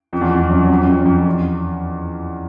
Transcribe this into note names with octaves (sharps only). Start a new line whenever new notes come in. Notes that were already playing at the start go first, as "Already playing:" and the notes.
F2
E2
F2
F2
F#2
F2
F#2
F2
F#2
F2
F#2
F2
F2
E2